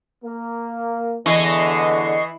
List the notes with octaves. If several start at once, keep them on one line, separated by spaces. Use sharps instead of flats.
A#3
E2 D3 E3 D#5 C#6 C7